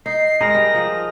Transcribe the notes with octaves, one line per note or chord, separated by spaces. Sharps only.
D#4 C7
G#3 D#4 G#4 A#4 A#6
G3
F3